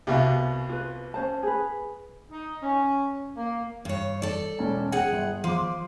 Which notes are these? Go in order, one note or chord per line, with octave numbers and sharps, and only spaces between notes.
C2 B2 G4 E5 F5
F4 B4
C#4 C5 A5
G#4 B4
D#4
C#4
A#3
G2 C#5
A4 D5
E1 C#4 A5
G#4 F#5 G5
G1
F3 C6 D6